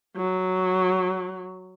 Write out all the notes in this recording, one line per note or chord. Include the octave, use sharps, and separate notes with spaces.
F#3